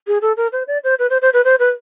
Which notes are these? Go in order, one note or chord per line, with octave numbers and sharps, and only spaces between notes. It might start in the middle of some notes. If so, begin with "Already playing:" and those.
G#4
A4
A#4
C5
D5
C5
B4
C5
C5
B4
C5
B4